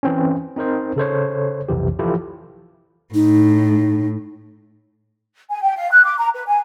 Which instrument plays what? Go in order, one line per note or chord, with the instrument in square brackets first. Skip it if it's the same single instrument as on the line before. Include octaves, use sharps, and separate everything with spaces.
[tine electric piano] E3 C4 C#4
C4 D#4 A#4 C5
C#3 A4 C5 C#5
B1 F2 C3 E3 G4
E3 F3 E4 F4 G4 A4
[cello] A2 [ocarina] D#4
[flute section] G#5
G5
F5
F#6
D6
A#5
B4
G#5